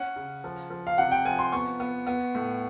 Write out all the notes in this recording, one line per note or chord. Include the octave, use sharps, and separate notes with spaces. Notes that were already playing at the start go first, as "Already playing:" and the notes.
Already playing: C#4 F#5
C#3
F3
F3
F5
C3 F#5
G5
F3 G#5
C6
B3 C#6
B3
B3
A2